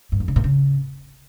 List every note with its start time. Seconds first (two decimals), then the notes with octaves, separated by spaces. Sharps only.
0.12 G2
0.20 F2
0.28 C#3
0.36 A#2
0.44 C#3